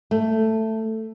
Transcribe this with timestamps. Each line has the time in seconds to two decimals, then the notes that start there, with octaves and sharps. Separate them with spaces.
0.11 A3